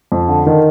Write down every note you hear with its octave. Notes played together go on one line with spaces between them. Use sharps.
F2
D3
D#3